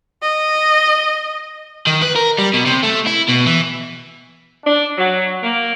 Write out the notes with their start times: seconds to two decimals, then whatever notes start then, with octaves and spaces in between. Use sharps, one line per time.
0.22 D#5
1.87 D#3
2.02 B4
2.16 A#4
2.38 G3
2.53 B2
2.65 C3
2.83 A3
3.06 E4
3.28 B2
3.46 E3
4.64 D4
4.97 F#3
5.42 A#3